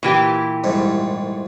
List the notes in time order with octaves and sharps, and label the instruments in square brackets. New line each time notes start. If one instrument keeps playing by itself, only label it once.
[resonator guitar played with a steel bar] A#2 E3 G4
[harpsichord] C2 F2 G#2